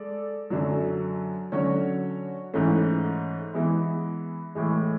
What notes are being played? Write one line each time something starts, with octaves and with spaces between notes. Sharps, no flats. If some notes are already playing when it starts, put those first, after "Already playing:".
Already playing: G#3 A4 D5
F#2 D3 F#3
D3 F#3 C#4 F#4 C#5
G#2 E3 A3 C#4
E3 G#3 B3 E4
A2 E3 G#3